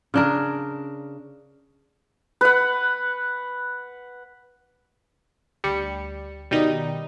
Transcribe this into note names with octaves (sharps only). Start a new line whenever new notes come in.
C#3 D4 A#4
B4 F#5
D2 G3 C#7
B2 D#3 G3 B3 D#4